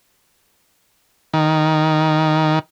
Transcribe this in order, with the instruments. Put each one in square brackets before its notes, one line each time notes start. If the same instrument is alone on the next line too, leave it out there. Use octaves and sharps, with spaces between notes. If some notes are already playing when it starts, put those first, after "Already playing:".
[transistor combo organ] D#3